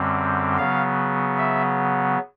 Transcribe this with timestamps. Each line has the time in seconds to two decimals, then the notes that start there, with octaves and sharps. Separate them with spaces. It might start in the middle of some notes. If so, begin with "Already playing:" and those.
Already playing: F#2 D3 G3 C4
0.58 C#3 F#3 B3 F5
1.38 E5